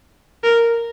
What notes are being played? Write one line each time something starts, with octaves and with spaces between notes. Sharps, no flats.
A#4